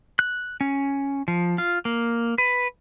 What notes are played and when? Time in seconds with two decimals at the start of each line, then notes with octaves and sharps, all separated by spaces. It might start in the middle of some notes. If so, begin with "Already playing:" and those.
0.19 F#6
0.61 C#4
1.28 F3
1.58 F4
1.85 A#3
2.38 B4